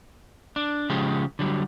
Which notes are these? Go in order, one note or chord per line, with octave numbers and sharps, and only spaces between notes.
D4
C#3 F3 G#3 G4
D3 F#3 G3